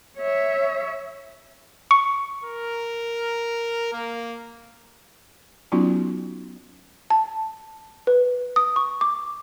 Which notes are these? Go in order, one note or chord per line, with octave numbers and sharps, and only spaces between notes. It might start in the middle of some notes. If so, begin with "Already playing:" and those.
C#5 E5
C#6
A#4
A#3
F#3 B3 C#4 D#4 F4 F#4
A5
B4
D#6
C#6
D6